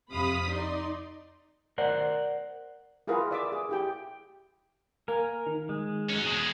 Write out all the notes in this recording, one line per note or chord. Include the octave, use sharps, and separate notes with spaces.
F2 C3 F5 B5 D#6 B6
D#4 D5 C6
A#4 C5 D5 F#5
E4 F4 G#4 A#4 B4 F#5
D5 E5 D6
G#4
E4 G4 G5
A#3 A#4 G#5
D#3
G#3
C#4 F#4
E2 G#3 G#4